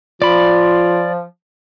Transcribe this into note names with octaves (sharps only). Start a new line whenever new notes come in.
F3 F4 D5 B5